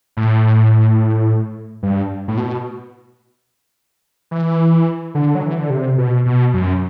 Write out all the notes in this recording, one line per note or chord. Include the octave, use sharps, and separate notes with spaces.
A2
G2
A2
B2
E3
D3
F#3
E3
D3
C3
B2
B2
F#2